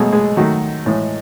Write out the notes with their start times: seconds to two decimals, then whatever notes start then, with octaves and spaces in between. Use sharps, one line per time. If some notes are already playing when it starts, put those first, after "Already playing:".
Already playing: B2 F#3 G#3 A3 G#4
0.12 G#3 G#4
0.37 D#3 F#3 A3 F#4
0.86 A2 E3 G#3